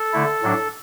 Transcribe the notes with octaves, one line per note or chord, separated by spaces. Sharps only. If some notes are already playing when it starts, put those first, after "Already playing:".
Already playing: A4
D3 A3 E4
A2 F#3 D4